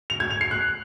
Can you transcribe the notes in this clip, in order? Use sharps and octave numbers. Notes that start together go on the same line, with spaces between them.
F7
G#6
F7
C7
F#6